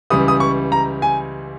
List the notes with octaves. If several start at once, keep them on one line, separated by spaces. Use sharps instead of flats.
C#2 C#3 E3 G3 D#6
D#6
C#6
A#5
G#5